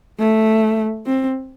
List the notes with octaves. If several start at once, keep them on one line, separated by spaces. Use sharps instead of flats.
A3
C4